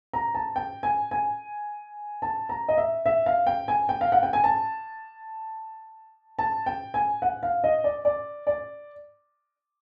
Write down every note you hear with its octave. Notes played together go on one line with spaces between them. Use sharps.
A#5
A5
G5
G#5
G#5
A5
A#5
D#5
E5
E5
F5
G5
G#5
G5
F5
F#5
G5
G#5
A5
A5
G5
G#5
F#5
F5
D#5
D5
D5
D5